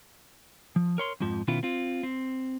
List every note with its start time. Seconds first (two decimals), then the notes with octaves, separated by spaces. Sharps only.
0.76 F3
0.98 A#4 C#5 C6
1.20 F2 G#2 F3
1.48 B2 D#3 B3 C#4 E4 F4
1.63 C4 F4
2.03 C4